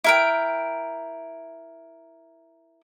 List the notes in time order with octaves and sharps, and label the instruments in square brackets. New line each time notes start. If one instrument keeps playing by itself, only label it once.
[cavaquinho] E4 A#4 G5